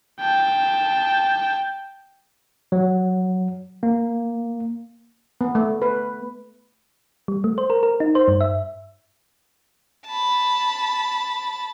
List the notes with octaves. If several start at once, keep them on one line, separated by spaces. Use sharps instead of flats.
G5 A5
F#3
A#3
B3
A3
B4
G3
A3
C5
A#4
A#4
D#4
C5
G2
E5
A5 B5